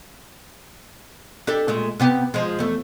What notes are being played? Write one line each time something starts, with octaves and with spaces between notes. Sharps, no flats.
D4 G4 A4
A#2 G#3 A3
C3 B3 G4
F3 G#3
E2 A3